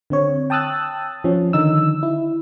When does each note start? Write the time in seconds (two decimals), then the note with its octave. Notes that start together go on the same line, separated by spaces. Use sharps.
0.10 D3 C4 C#5
0.50 G5 A5 D#6 E6 F#6 A6
1.24 F3 C#4
1.53 D3 D#3 D#4 E6
2.03 E4